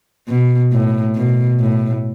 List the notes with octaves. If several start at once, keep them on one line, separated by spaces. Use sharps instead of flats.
B2
A2
B2
A2